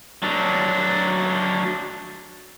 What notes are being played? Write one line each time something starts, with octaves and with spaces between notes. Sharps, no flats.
F#3 D4